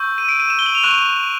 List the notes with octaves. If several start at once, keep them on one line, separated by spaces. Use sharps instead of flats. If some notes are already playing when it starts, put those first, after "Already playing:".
Already playing: C#6 E6 G6
D#7
D7
D#7
E7
G7
F#7
F7
C#6 F#6 E7